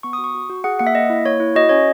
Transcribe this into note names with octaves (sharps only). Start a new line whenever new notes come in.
B3 C#6
D#6
F#4
C#6
F#4
F#4
G#4 F#5
A#3 F#5
E5
A#3 D#5
E4
A#3 C#5
E4
F#4 D#5
C#4 C#5